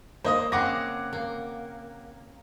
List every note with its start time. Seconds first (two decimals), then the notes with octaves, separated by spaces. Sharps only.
0.24 A#3 C5 D#5 D#6
0.52 C#3 C4 G#4 F#5 D6 A#6
1.13 A#3